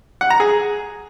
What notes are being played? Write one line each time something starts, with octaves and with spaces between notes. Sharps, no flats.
F#5
A#5
G#4